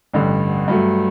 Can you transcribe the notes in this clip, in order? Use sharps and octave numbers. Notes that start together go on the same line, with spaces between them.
A1 G2 D3
G2 F#3 A3